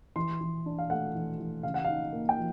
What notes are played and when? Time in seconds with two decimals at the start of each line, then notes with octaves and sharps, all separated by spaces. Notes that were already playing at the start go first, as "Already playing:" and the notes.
0.16 E3 C6
0.41 E3
0.66 D4
0.78 F5
0.90 A3 F#5
1.15 E3
1.40 E3
1.63 C#3 F5
1.74 F#5
1.84 D#4 F5
2.13 A#3
2.29 G5
2.37 F3